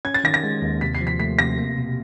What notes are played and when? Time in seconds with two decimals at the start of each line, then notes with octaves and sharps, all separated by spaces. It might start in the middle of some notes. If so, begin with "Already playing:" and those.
0.05 C#4 G#6
0.14 A6
0.24 D#3 A#6
0.34 A#6
0.44 G#3
0.62 D#2
0.81 C3 B6
0.95 C7
1.01 F3
1.07 B6
1.20 A3 B6
1.39 C3 A#6
1.58 A#3
1.78 B2